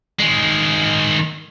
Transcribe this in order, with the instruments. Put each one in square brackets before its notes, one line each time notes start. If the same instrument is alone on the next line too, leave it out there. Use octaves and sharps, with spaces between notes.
[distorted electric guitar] D#3 G#3